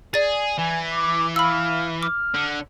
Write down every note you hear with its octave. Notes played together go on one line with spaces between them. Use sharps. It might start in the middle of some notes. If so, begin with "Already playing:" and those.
G#4 D5 A6
E3 G#5
D6
F5 B5 E6
D6 F6
D3